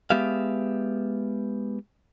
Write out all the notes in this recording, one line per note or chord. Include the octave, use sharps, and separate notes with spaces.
G#3 B3 G4 E5 F5